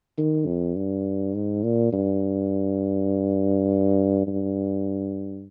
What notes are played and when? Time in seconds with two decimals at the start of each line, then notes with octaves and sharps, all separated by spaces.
0.18 D#3
0.46 F2
0.76 G2
1.34 G#2
1.63 A#2
1.93 G2
4.27 G2